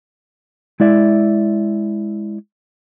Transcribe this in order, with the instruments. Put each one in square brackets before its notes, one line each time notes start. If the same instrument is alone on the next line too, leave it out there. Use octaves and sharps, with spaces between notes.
[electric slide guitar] G#3 E4 D5 E5